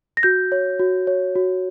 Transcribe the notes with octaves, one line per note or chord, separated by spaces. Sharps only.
A#6
F#4 G6
C#5
F#4
C#5
F#4